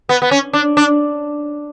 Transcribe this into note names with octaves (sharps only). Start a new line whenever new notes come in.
B3
B3
C#4
D4
D4